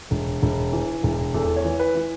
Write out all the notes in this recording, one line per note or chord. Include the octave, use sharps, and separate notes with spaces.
E1
E1
E3
E1
E2 A4
C#5
E3
B4
E3